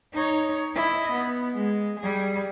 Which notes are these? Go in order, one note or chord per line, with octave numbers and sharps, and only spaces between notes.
D#4 C#5
E4 D#5
B3
G#3
G3 G#4